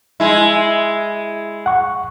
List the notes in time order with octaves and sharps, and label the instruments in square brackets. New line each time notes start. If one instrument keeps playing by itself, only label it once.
[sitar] G#3 E4
[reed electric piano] F#5 C#6